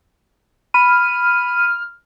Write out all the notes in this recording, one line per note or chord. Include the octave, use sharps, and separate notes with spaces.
B5 F6 D#7